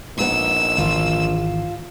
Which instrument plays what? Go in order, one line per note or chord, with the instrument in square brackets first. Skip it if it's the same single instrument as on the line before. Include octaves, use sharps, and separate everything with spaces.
[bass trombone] A#1 [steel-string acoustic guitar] B3 D#4 [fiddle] E6
[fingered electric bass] G#1 D#3 E3 [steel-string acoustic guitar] F4